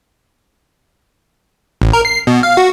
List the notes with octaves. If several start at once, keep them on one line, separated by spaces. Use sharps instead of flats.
A1
A#4
C7
B2
F5
F#4